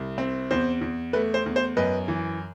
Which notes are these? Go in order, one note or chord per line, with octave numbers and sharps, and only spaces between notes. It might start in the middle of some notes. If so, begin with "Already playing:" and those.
Already playing: C2
C4
E2 C5
E2
A3 B4
C5
E2
C5
F#2 B4 D#5
E3